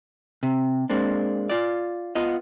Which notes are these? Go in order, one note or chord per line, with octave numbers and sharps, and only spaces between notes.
C3
G#3 A#3 C4 D4
F4 D5
B3 F4 D#5